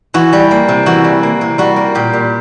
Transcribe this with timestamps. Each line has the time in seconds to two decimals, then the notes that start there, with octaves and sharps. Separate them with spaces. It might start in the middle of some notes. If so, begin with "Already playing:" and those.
0.14 E3 F#4
0.33 G3
0.51 A#3
0.68 C3
0.86 E3 F#4
1.04 G3
1.23 A#3
1.41 C3
1.58 G3 F#4
1.76 A#3
1.95 A#2 G4
2.13 A#2